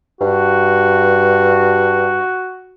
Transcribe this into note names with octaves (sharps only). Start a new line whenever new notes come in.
G2 F#4